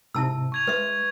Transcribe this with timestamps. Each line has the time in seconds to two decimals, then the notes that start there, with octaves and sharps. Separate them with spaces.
0.15 G#2 C3 E4 A5 E6
0.52 C#6 G#6 F7
0.67 G#3 B4 E5